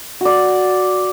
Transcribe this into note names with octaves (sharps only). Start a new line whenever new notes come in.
F#4 D5